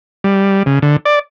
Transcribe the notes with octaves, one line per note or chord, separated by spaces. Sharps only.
G3
C#3
D3
D5